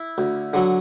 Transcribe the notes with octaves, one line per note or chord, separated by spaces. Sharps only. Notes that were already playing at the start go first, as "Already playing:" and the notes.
Already playing: E4
D2
D3 F#3